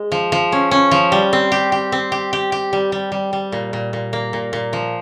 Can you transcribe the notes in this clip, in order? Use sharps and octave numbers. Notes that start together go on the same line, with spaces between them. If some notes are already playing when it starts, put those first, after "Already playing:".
Already playing: G#3
F3
F3
C#4
C#4
F3
G3
C4
G4
G4
C4
G4
G4
G4
G3
G3
G3
G3
A#2
A#2
A#2
A#3
A#2
A#2
F3